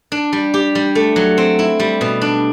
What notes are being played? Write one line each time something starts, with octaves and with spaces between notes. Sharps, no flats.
D4
G3
G4
G3
A3
F#3
C4
E4
G3
B2
D4